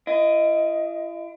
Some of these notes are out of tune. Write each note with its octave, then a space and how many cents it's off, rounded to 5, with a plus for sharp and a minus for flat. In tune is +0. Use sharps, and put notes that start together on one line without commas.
E4 +45 D#5 +0